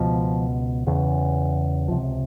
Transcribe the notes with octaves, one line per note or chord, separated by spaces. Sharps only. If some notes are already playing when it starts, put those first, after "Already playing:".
Already playing: C#2 B2 F3
E2 C#3
C#2 C3 F3